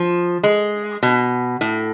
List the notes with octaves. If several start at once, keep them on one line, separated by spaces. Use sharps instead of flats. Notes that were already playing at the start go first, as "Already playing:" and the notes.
Already playing: F3
G#3
B2
A2